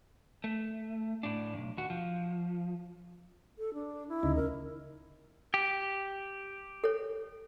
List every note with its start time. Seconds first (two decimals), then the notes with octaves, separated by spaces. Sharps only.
0.44 A3
1.23 A2 D4
1.53 B1 E2
1.77 D#2 F#4
1.90 F3
3.58 A4
3.74 D4
4.08 E4
4.23 D2 C#3 D#4
4.36 A#4
5.54 G4
6.84 A4 C#5